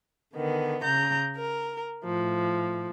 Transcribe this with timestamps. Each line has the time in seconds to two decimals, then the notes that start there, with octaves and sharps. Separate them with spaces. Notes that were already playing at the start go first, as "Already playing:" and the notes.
0.34 D3 D#3 B3
0.83 C#3 A#5 G6
1.36 A#4
2.04 A2 F3